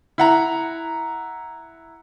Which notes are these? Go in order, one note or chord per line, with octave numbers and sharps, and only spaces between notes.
E4 F#5 A#5